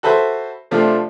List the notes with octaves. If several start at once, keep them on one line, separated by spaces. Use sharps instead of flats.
F#4 A4 B4 C5 E5
C3 F3 A3 D4 F4